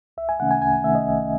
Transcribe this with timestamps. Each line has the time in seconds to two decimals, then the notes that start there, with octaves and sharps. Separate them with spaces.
0.17 C2 E5
0.29 G#5
0.40 C3 D#3 A3 C#4 F#5
0.51 G#5
0.62 C2 G#5
0.84 C3 D#3 A3 C#4 E5
0.95 D#5
1.06 C2